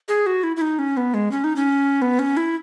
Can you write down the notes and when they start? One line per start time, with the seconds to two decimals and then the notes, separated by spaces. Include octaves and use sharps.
0.08 G#4
0.26 F#4
0.43 E4
0.57 E4
0.61 D#4
0.79 C#4
0.97 B3
1.14 G#3
1.31 C#4
1.44 D#4
1.56 C#4
2.02 B3
2.19 C#4
2.37 E4